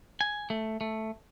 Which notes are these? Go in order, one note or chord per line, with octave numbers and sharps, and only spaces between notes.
G#5
A3
A3